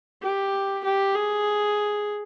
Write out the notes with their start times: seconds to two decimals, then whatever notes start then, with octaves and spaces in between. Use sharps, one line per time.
0.22 G4
0.84 G4
1.15 G#4